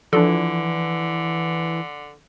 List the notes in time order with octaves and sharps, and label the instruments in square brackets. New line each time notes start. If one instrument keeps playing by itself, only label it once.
[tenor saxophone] D3 [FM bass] E3 [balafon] F3 [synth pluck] D4 F4 A4